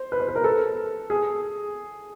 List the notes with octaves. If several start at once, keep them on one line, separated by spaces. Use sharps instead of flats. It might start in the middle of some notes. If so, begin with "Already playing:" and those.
Already playing: C5
B4
C5
B4
A#4
A4
G#4